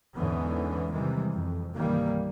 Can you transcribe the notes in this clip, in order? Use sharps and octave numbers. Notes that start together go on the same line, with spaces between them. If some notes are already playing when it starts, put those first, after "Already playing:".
E2 G#2 D3 E3 B3 C#4
C3 D#3 E3 G3 G#3
F2
G1 C2 D#3 E3 G3 A#3